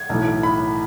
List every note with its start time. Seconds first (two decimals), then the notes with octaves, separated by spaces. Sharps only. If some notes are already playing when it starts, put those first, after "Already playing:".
Already playing: G#6
0.09 B1 A2 E3
0.43 B5